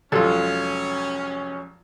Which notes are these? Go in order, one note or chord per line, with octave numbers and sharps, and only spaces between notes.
F1 F#3 G#3 C#4 F4 A4